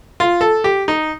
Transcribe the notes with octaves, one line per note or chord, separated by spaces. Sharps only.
F4
A4
G4
D#4